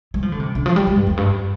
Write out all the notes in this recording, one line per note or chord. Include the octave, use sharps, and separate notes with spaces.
G3
F3
D3
C3
D3
F3
G3
G3
G2
F2
G2